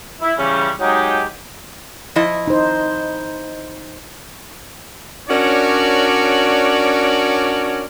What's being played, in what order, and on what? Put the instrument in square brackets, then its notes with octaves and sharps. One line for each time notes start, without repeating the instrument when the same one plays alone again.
[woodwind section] E4
C#3 E3 G3 C#4
F#3 G#3 D#4 G4
[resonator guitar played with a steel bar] F3 E4 D#5
[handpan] D#4 C5
[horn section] C#4 D4 F#4 A#4 C#5 D5